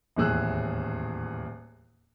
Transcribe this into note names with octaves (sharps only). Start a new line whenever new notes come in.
D#1 E2 A2 G#4 E6 F#6